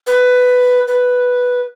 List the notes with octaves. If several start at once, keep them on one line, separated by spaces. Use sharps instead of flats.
B4
B4